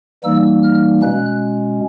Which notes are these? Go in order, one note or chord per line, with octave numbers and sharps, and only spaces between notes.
E3 G3 A#3 D#4 E6
F6
B2 G#3 C#4 F#6